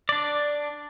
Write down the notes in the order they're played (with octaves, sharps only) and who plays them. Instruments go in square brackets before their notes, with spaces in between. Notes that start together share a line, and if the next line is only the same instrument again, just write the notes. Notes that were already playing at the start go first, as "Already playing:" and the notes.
[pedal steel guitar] D4 D5